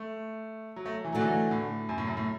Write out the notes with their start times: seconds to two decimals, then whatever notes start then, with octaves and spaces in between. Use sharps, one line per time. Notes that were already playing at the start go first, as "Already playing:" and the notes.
Already playing: A3
0.76 F#3
0.86 A3
1.05 E3
1.13 D3 F#3 A3 F#4 A4
1.21 E3
1.51 A2
1.89 F#2
1.98 A2
2.07 F#2
2.17 A2